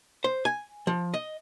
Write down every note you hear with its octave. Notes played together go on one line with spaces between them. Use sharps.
C5
G#5
F3
D#5